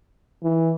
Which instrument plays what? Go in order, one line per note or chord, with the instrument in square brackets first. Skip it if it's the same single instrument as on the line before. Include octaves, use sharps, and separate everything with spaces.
[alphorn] E3